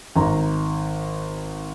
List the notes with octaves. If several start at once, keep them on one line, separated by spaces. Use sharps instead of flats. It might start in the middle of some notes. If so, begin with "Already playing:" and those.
G#1 A#5